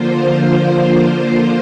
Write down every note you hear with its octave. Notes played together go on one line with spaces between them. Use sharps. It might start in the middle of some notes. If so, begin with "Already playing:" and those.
Already playing: D3 F3 A#3 F4 C5
C5